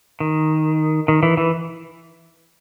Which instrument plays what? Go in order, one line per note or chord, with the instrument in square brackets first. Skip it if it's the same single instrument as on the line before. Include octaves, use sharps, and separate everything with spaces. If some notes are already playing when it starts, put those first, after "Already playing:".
[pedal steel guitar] D#3
D#3
E3
E3